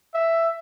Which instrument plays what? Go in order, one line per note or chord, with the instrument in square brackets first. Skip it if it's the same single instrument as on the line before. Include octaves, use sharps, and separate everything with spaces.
[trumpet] E5